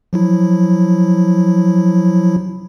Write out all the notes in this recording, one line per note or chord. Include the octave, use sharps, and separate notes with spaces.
F3 F#3 E4